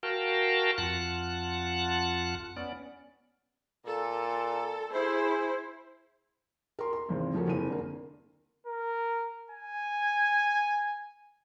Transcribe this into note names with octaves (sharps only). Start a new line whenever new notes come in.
F#4 A#4 F5 G5 A5
F2 F4 F#5 A5 F#6
B3 C#4 D5
A#2 A4
E4 G#4 C5
A#4 C6
C6
G#1 E2 C3
C#3 F3 A3 A#3 C#4 F#4
F#1 C3 D#7
D3 A#3
A#4
G#5